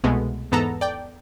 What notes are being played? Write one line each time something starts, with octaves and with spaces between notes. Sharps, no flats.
C2 B2 G#3 A3 B3
E2 G#2 B3 A4 A5 A#5
D5 G5